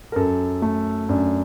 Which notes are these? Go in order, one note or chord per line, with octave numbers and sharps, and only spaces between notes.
A#4
F#2 A4
A3
F#2 D4